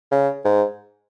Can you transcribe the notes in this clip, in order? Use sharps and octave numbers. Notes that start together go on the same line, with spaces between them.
C#3
G#2